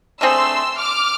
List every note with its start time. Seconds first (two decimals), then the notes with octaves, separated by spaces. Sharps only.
0.21 D3 A3 C4 G#4 C6 E6
0.78 D6 F6